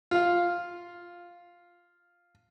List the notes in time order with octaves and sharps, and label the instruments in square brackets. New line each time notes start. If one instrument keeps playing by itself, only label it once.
[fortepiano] F4 F5